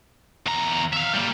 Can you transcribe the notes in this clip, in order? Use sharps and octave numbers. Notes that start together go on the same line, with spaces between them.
E2 A#5
E5 F5
G3 A#3